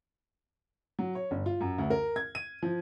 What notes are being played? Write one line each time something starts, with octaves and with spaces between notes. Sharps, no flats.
F#3
C#5
G1
F4
F#2
D2
A#4
G#6
D#7
F3